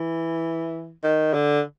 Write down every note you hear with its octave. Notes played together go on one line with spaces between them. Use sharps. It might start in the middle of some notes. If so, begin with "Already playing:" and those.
Already playing: E3
D#3
D3